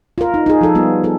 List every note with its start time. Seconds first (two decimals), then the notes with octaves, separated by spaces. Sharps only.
0.18 F4 A#4
0.34 D#4
0.46 D#4 G#4
0.61 F3 A4
0.75 G3 B3 F4
1.04 G#4 A4